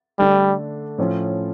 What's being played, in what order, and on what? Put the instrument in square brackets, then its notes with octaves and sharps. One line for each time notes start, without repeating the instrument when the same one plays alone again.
[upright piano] D3 A3 D4 [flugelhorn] G3
[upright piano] A2 F3 C#4 F4